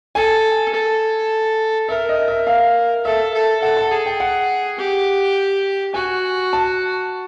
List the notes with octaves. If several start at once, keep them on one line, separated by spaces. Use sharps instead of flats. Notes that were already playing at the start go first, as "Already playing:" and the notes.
A4 G#5
A4
A#4 E5
D#5
E5
F5
A4 E5
A4
A4 F#5
A5
G#4
G5
F#5
G4
F#4 G#5
A5